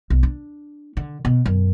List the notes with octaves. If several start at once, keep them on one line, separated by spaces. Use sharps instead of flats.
B1
D4
D3
B2
F#2